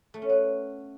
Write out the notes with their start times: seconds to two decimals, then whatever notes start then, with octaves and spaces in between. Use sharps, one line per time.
0.14 A3
0.22 C#4
0.29 B3